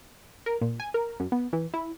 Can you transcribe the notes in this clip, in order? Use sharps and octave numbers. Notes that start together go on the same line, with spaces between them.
A#4
A#2
G#5
A#4
F#2
B3
E3
E4